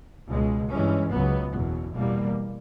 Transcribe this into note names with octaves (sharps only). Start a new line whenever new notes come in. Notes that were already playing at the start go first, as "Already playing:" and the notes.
C#2 B2 G#3
G2 E3 G#3 C#4
C#2 C#3 F#3 B3
F#1 E2 B2 F#3
E2 B2 G3 A#3